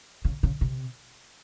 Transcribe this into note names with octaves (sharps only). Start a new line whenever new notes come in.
C#3
C#3
C3